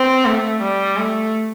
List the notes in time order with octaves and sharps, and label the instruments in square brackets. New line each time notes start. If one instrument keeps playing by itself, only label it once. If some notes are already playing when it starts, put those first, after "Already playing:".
Already playing: [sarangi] C4
A3
G3
A3